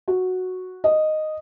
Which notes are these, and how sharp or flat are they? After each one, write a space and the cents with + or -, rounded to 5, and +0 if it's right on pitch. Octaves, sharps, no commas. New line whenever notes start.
F#4 -5
D#5 -5